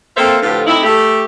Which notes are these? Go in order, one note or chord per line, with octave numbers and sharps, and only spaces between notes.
A#3 C4 F4 A4 C5 E5
A2 D3 E3 F3 F4 G4
C3 A3 D#4 E4
A3 G4